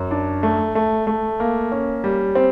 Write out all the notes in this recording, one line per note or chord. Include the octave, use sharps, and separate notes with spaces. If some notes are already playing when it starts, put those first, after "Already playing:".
Already playing: F#2
D4
A3
A3
A3
A#3
C#4
G3
C4